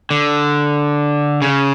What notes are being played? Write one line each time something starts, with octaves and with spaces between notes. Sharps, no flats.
D3
C#3